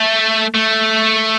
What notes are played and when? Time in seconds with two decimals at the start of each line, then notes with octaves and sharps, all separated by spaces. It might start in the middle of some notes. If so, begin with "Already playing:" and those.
Already playing: A3
0.55 A3